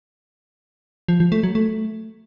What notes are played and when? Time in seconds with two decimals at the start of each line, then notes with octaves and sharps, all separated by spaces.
1.08 F3
1.20 F3
1.32 A3
1.43 F#3
1.55 A3